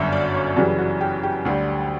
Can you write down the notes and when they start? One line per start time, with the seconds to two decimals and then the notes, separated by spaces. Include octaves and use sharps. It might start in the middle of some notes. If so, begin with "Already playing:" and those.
Already playing: G1 F#2 D3 E5
0.12 D5
0.34 C#5
0.56 F#2 C#3 E3 G3 F#4
0.79 F#4
1.01 G4
1.23 G4
1.45 D2 D3 G3